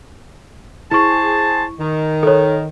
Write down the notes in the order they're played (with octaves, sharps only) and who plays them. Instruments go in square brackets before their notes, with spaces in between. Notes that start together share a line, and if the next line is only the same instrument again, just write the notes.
[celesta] E4 C#6 [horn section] G#4 C5 A5
[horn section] D#3
[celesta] A4 C#5